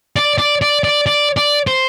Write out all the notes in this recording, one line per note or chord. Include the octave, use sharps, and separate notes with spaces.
D5
D5
D5
D5
D5
D5
C5